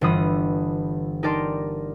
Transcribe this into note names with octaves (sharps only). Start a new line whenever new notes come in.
G1 E3 G3 F4 B5 D#6
D#4 G4 A#4 D5 A5 C6